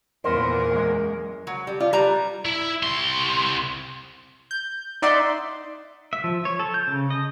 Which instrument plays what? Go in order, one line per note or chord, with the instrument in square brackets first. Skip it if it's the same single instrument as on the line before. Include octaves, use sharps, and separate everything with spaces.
[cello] E2 A#2 [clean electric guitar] B3 C5 [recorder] A#4
[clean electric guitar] F#2 G#3
[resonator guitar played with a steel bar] F#3
G3
[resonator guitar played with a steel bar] F4 [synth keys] D5
[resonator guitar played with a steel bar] G3 B4 A#5
[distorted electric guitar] E4
C2 C6
[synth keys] G6
D#4 D5 E5 F#5 C6
[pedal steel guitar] E5
F3
C#5
A4
G6
C#3
D#5